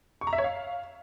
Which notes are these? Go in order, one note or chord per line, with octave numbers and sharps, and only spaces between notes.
C#6
A#5
E5
C#5
F5